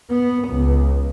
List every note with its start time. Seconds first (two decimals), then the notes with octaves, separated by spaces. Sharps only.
0.10 B3
0.48 C#2